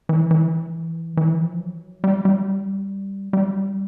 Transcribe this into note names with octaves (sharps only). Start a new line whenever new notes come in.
E3
E3
E3
F3
F#3
G3
G3
G3